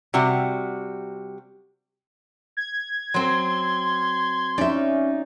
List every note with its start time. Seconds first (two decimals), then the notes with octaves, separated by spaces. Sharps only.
0.14 C3 G3 F#4
2.57 G#6
3.14 F#3 C4 C6
4.58 C#4 D#4 D5 E5